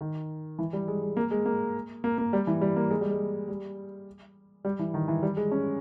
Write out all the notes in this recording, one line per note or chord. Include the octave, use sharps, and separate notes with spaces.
D#3
E3
G3
G#3
G#3
A#3
G#3
A#3
A#3
A#3
G3
E3
G3
A#3
G#3
G3
G#3
G3
G3
E3
D#3
E3
G3
G#3
C#4